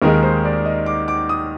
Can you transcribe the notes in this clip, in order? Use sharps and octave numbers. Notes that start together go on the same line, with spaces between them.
D#2 D#3 G#3 D#4 A#4
C5
D5
D#5
D6
D6
D#6